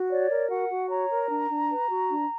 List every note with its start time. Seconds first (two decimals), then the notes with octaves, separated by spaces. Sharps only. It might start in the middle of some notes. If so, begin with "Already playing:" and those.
Already playing: F#4
0.10 C#5 D5
0.30 A#4
0.50 F#4 F#5
0.70 F#4
0.90 C#5 A#5
1.10 A#4
1.31 D4
1.50 D4
1.70 B4
1.90 F#4
2.10 D4